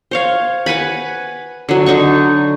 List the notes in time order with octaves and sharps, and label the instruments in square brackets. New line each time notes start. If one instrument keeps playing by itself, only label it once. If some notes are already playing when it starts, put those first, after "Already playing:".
[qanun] C5 C#5 F5
B4 F#5 G#5 B5
D3 F#3
D3 D#4 C#6